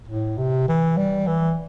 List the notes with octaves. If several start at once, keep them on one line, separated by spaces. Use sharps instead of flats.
A2
C3
E3
G3
E3